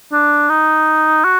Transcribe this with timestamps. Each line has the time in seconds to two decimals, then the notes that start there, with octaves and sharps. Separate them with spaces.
0.12 D4
0.50 D#4
1.25 F#4